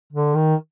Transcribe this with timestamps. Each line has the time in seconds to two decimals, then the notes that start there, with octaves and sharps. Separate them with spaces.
0.13 D3
0.35 D#3